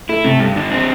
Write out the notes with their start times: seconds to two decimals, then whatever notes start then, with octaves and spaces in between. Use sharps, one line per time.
0.09 A3 E4
0.24 C3 A3
0.40 G2
0.56 D3
0.72 C4